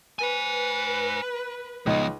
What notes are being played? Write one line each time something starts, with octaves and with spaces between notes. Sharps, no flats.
B4 C5 G#5
C#2 F3 B3 D#4